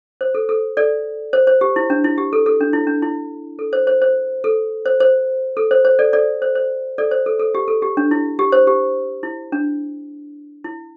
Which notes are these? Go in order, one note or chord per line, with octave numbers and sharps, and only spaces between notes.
C5
A4
A4
A4 D5
C5
C5
G4
E4
D4
E4
G4
A4
A4
D4
E4
D4
E4
A4
C5
C5
C5
A4
C5
C5
A4
C5
C5
A4 D5
A4 D5
C5
C5
A4 D5
C5
A4
A4
G4
A4
G4
D4
E4
G4
C5
G4
E4
D4
E4